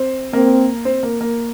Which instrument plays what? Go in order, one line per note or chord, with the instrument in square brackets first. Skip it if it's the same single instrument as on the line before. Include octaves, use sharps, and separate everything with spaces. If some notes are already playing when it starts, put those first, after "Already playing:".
Already playing: [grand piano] C4
[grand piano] A#3 [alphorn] C4
[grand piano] C4
A#3
A#3